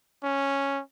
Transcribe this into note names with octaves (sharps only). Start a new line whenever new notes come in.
C#4